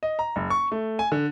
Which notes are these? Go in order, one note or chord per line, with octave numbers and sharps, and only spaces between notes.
D#5
A#5
F#1
C#6
A3
G#5
D3